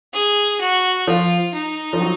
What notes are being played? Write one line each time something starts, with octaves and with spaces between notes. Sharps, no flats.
G#4
F#4
F3 F4
D#4
F3
F#3